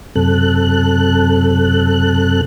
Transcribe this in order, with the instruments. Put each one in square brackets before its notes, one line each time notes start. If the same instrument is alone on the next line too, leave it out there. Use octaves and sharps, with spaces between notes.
[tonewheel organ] F#2 C3 A4 F#6